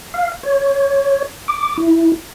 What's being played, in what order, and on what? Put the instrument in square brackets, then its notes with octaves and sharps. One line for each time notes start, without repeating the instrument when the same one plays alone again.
[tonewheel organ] F5
C#5
D6
E4